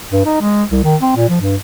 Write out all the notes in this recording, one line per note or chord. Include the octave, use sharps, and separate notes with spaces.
G2
D#4
G#3
C2
D#3
C4
A#2
F3
G2